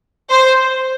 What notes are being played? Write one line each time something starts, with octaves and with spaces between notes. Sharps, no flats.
C5